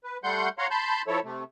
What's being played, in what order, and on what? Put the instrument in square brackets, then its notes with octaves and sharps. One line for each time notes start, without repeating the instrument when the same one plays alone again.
[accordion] B4
G3 A3 F#5 C6 G6
C#5 F5 F#5 A#5 C6
A5 B5 C6 G6
F3 E4 A4 C#5
C3 A3